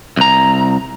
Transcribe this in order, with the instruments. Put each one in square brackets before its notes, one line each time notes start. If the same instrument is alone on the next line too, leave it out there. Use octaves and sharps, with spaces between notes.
[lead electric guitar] C2 A#5